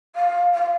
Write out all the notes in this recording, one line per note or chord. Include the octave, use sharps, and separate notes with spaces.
F5
F5